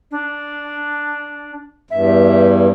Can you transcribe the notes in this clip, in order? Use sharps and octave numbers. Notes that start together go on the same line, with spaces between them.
D4
E2 G2 E5